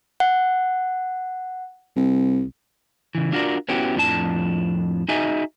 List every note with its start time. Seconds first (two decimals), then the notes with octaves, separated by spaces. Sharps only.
0.20 F#5
1.96 C2
3.15 C#3 E3
3.32 D4 F4 F#4 G#4 A#4 D5
3.69 B3 C#4 E4 F#4 G4
3.96 F2 A2 F3 D4 F4 A5
5.09 D#4 F#4 G#4 D#5 E5 G#5